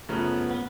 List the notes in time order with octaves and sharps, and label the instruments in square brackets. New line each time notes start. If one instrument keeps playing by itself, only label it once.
[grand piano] F#2 C#3 F3 A3 C#4 [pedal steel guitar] B3
[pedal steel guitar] B3